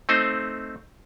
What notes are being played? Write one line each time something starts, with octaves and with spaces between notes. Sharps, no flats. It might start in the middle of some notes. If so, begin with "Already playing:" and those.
A3 C4 D#4 C5